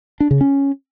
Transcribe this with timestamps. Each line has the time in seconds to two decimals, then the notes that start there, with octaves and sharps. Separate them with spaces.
0.20 D4
0.31 C#3
0.41 C#4